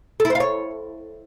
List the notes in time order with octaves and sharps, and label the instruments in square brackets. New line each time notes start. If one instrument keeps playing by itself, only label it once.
[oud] A4
E4
C5
F5
C#5